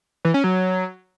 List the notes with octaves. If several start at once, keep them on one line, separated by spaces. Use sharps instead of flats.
E3
C#4
F#3